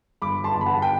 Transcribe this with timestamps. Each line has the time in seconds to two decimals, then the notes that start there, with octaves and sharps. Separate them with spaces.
0.22 G1 B5 D6
0.44 A5 C6
0.55 G1
0.61 B5
0.66 F#5 A5
0.82 G5